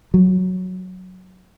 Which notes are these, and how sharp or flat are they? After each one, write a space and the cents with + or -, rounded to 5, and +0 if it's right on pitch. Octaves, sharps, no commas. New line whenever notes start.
F#3 -5